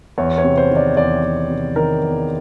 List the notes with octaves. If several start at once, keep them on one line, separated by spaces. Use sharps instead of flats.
E2 C#5
C#5
C3
C5
D#3
D5
E2 D5
E2
C3
D#3 A#4
E2